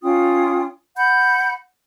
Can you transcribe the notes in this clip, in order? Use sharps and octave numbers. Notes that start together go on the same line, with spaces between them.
C#4 F4 G5 D#6
F#5 B5 G6